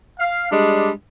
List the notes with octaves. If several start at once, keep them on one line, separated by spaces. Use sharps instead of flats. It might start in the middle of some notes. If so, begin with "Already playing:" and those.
F5
G3 G#3 D4